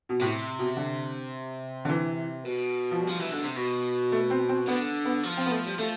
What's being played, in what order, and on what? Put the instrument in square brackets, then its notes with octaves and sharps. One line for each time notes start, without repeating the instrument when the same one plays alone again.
[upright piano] B2
[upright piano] A2 [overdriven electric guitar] C3
[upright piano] B2
D3
D3
E3
[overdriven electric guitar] B2
[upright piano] F3
G3
[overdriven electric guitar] F3
E3
D3
C3
B2
[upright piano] A3
C4
C4
[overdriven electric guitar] D3 [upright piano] B3
[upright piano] B3
[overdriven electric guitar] F3
[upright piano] C4
B3
A3
G3
[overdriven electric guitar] F3 [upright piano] A3